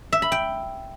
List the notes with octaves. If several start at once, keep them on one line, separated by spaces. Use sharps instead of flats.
E5
B5
G5